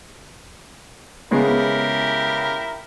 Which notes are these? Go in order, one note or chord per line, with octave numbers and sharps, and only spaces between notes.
C#3 G#3 B3 E4 G4 A#4